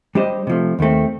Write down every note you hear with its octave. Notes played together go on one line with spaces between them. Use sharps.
G3 D4 G4 C5 D#5
C3 F3 A3
D#2 D#3 A3 C4